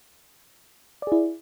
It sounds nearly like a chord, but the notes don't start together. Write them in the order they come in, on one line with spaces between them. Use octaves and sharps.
D5 G#4 E4